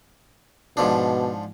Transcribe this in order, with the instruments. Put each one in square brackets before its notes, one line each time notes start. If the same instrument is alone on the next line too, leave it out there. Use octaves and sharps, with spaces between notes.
[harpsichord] G#2 F3 D4 [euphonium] B2